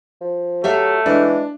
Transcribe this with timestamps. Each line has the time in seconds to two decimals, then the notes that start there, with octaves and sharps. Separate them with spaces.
0.21 F3
0.64 F#3 A3 G4 E5 F5
1.06 E3 G#3 D4